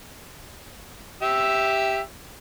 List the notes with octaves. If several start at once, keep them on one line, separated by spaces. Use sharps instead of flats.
G4 E5 E6